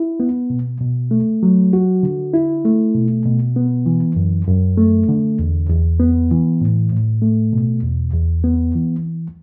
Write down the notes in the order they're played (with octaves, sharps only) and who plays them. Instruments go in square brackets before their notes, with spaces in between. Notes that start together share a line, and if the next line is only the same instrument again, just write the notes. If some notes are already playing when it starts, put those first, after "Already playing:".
Already playing: [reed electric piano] E4
B3
B2
B2
A3
F#3
F#4
D3
E4
A3
B2
B2
B3
E3
F#2
F#2
A3
D3
E2
E2
B3
E3
A2
A2
A3
B2
E2
E2
B3
E3